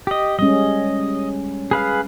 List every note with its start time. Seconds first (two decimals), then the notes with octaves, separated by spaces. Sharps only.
0.07 G4 D#5
0.39 G3 G#3 C#4 D#5
1.71 G#4 B4 F5